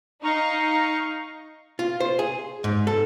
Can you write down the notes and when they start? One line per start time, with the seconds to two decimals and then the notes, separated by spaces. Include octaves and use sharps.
0.24 D#4 F5 A#5 C#6
1.79 F4
2.00 C5
2.19 G#4
2.64 G#2
2.87 A4